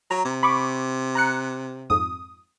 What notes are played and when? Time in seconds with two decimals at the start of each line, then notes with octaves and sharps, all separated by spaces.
0.11 F#3 A#5
0.25 C3
0.43 B5 C#6 D6
1.15 A#5 F#6 C#7
1.90 F2 G#2 D#6